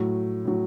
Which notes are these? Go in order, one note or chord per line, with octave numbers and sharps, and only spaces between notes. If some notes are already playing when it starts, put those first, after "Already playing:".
Already playing: A2 F#3
A2 F#3